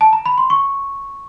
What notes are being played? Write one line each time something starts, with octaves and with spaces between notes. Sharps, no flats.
A5
A#5
B5
C6
C#6